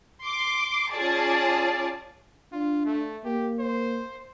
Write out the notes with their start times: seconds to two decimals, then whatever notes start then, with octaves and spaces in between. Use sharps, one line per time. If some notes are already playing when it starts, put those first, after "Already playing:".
0.23 C6 D6
0.90 C#4 F4 G#4 D5 A5
2.53 D4 F4
2.85 A3
3.25 A#3 G4
3.59 C5